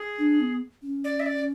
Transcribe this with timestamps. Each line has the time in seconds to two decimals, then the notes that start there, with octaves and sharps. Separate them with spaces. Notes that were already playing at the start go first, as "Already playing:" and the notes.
Already playing: G#4
0.18 D4
0.41 B3
0.82 C#4
1.04 D5
1.20 E5
1.26 D5